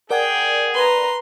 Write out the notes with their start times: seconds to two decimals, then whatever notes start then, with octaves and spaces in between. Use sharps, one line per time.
0.10 G#4 A#4 D5 F#5 G5
0.75 B4 A#5 C6